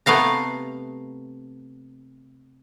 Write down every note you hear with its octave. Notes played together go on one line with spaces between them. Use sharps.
C3 A3 B3 F5 A#5